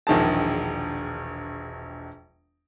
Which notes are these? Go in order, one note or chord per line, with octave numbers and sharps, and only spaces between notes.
E1 A#1 D#3 G#4 A5